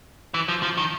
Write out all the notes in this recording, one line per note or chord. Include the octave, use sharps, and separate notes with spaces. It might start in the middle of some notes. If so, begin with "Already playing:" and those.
E3
F3
F3
D#3